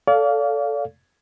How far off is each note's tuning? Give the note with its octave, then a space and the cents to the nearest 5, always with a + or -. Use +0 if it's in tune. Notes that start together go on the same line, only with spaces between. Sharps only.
A4 +0 D5 -40 F5 +0